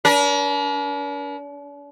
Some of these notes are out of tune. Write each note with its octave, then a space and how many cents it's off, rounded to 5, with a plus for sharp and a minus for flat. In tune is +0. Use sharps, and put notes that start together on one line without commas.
D4 -45 A#4 +40